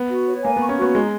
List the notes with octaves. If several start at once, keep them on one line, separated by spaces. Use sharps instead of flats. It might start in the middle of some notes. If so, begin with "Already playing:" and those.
Already playing: B3
F#4
C#5
A#3 G#5
B3
C#6
C#4
B3 F#4
G#3 D#4